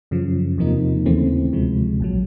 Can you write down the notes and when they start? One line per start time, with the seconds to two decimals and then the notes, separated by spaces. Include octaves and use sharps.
0.11 F#2 C#3 F3
0.58 E2 C3 F3 A#3 D#4
1.06 D#2 C#3 E3 A3 C4
1.53 D2 C3 F3 G#3
2.00 A#1 A#2 F#3